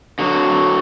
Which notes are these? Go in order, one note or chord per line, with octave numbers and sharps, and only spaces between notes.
D3 F#3